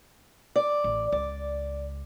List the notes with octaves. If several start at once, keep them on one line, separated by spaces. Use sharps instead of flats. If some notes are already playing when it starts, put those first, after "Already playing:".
D5
A1
C#2 D5